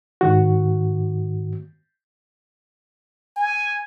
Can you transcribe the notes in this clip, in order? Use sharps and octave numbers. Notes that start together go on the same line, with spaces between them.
G#2 D#3 F#4
G#5